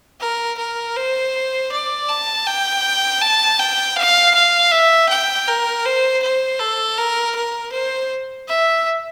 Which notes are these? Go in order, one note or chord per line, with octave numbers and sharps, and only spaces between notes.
A#4
A#4
C5
D5
A5
G5
A5
G5
F5
F5
E5
G5
A#4
C5
C5
A4
A#4
A#4
C5
E5